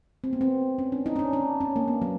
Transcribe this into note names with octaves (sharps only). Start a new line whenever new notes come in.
C4
B3
C4
C#4
D4
D#4
C#4
D4
D4
C#4
A#3
B3
F#3